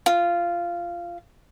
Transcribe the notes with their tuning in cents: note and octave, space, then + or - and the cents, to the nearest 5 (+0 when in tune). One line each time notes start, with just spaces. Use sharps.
F4 -15